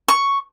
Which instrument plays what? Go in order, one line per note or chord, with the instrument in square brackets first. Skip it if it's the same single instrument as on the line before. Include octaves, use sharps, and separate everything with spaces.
[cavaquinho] C#6